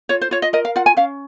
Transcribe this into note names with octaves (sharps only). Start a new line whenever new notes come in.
F4 C#5
C5
F4 C#5
D#5
A#4 D#5
F5
F4 F#5
G#5
C#4 F5